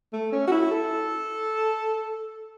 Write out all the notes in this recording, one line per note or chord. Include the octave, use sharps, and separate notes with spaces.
A3
C#4
F#4
E4
A4